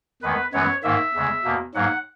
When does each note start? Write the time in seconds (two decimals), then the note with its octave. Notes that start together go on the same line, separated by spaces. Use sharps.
0.22 E2 D#3 G#3 B3 B4
0.53 F#2 E3 G#3 B3 C#5
0.83 G#2 D#3 A#3 E5
1.14 E2 C#3 G#3
1.44 E2 B2 A#3
1.74 G#2 F#3 A#3 F#5